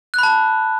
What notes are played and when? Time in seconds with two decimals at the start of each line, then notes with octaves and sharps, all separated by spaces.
0.14 F#6
0.19 B5
0.23 A5